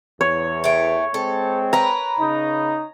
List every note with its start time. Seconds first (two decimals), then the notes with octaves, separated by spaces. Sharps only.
0.21 E2 C#5
0.64 A3 G5
1.14 G#3 C4 A4
1.73 A#4 B4 A#5
2.19 C#3 D#4